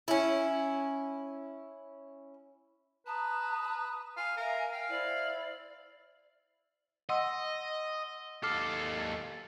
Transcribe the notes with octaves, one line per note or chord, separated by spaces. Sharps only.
C#4 E4
B4 A5 A#5 D#6
F5 G#5
A#4 E5 F5
F5 G5
E4 C5 D5
D#5 F#5 C6 E6
D#2 A4 D6 F6 C7